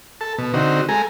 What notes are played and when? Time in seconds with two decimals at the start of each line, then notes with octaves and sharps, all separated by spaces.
0.21 A4 A5
0.38 B2
0.54 D3 C4 D#4 F#4
0.89 G#3 A4 G#5 A#5